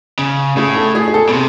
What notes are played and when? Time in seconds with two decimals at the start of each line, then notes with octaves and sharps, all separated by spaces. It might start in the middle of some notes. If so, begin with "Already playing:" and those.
0.19 C#3
0.57 A2 G#4
0.76 A4
0.95 G#4
1.08 G#4
1.14 A4
1.29 B2
1.33 C3